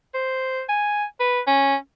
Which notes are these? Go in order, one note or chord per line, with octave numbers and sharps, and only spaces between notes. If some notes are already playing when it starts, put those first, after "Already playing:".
C5
G#5
B4
C#4